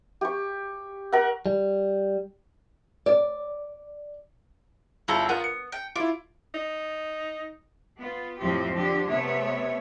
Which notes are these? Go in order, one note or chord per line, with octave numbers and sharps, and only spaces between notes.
G4 C#6
A#4 F#5
G3
D5
G1 E4 F4 A4 A#5 C#7
B3 F4 A#4 F#5
C#7
G5
E4 F4 D6
D#4
B3 F4
F2 A2 F3 C4 G4
D3 F3 G4
C3 A3 B3 C#5 E5